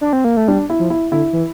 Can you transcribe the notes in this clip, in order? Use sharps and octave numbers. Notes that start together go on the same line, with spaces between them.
D4
C4
A#3
A3
G3 D4
E4
F3
E4
D3 E4
E3